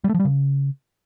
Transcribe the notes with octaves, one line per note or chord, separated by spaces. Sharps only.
G3
A3
F3
G3
C#3